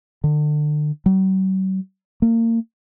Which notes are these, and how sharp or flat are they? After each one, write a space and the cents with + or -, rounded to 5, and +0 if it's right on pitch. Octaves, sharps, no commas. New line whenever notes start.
D3 +35
F#3 +45
A#3 -30